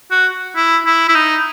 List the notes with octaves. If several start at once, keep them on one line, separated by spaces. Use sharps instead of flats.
F#4
E4
E4
E4
D#4